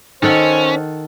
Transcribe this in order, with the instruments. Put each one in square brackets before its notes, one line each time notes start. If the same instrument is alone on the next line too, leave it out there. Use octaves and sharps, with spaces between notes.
[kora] D#3 A4 F#5 [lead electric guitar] C#4 [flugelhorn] C5